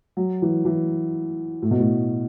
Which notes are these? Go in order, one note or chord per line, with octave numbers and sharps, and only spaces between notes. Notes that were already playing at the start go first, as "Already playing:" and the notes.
F#3
E3
E3
A2
B2
A2